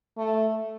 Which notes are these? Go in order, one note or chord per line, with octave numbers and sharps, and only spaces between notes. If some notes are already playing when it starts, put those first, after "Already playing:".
A3